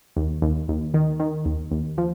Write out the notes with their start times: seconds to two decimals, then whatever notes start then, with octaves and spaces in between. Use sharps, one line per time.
0.16 D#2
0.42 D#2
0.68 D#2
0.94 D#3
1.20 D#3
1.45 D#2
1.71 D#2
1.98 F3